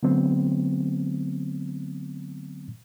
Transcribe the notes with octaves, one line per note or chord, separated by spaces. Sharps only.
D3 F#3 A3 B3 C4